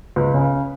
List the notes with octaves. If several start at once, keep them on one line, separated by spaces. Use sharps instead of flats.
C#2 B4
C#3